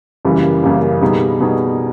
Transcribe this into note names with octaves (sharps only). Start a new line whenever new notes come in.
F#2 C#3 E3 G3 A#3
F#2 C#3 E3 G3 A#3
B2 G3 B3 D#4 G#4
B2 G3 B3 D#4 G#4